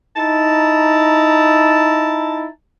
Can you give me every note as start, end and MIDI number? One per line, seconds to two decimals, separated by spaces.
0.17 2.45 63
0.17 2.45 64
0.17 2.45 81
0.17 2.45 82